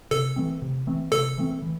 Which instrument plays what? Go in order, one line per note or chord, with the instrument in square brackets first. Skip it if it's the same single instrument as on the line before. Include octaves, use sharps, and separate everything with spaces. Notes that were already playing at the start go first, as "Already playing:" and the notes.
[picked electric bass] C3 [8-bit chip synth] A4
[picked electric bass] E3 A3 C4
C3
E3 A3 C4
[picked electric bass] C3 [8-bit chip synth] A4
[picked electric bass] E3 A3 C4
E3